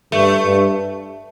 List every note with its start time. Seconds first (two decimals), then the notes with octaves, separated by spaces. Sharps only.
0.12 G2 A3
0.45 G2